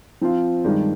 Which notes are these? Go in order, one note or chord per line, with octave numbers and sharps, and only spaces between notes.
F3 C4 F4
G2 D#3 G#3 D4